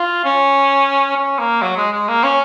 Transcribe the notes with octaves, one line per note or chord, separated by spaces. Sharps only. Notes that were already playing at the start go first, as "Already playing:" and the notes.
Already playing: F4
C#4
C#4
A#3
F#3
G#3
G#3
A#3
C#4